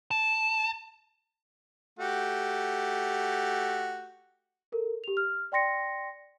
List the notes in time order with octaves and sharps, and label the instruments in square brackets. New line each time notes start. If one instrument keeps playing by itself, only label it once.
[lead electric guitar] A5
[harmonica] A3 F#4 G4
[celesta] A4 A#4
G4 F7
F6
D5 G5 C6 A#6 C#7